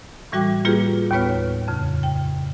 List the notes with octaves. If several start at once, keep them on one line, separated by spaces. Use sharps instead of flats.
A2 E3 G3 F#4 G5 D6
G3 A#3 F4 G4 G#4 B4
D#2 A2 B3 B4 C#5 F6
F2 C#3
G5